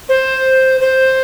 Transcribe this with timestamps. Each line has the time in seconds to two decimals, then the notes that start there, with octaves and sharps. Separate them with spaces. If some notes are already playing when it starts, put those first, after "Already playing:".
0.09 C5
0.81 C5